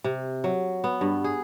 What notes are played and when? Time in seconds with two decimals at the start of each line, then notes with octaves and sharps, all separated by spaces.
0.04 C3
0.44 F#3
0.84 B3
1.01 G2
1.24 G#4